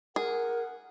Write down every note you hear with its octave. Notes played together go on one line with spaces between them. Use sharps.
G#4 A#4 F#5